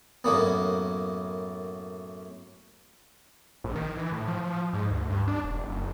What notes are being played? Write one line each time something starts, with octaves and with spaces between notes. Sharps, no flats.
F#2 A2 A#3 B3
A#1
D#3
E3
A2
F3
F3
G#2
D2
G2
D4
E1
F#1